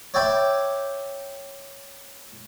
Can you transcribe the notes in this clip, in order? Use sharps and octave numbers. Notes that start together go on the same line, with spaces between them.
C#5 D5 E5 G5 B5